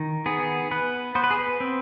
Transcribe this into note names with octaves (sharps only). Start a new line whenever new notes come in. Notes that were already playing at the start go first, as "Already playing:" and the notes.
Already playing: D#3
B3 G#4
B3 B4
B3 C5
B4
G#4
B4
C4